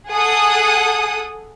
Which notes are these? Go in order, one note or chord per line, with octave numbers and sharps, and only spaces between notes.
G#4 A4 F#5 D#6